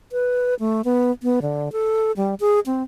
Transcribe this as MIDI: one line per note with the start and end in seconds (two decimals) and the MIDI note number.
0.12 0.55 71
0.60 0.82 57
0.85 1.11 59
1.23 1.40 59
1.42 1.72 50
1.72 2.12 69
2.17 2.35 55
2.40 2.60 68
2.66 2.83 60